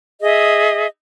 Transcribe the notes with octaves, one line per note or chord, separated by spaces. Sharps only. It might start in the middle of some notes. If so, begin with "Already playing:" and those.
G#4 D#5 E5